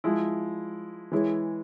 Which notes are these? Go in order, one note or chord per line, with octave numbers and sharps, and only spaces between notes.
F3 G#3 E4
E3 G#3 E4 G#4 C#5